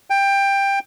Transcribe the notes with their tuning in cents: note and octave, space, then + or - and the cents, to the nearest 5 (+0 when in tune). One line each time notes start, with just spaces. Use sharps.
G5 +15